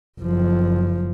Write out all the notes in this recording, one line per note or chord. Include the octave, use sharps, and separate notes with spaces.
F#1 F3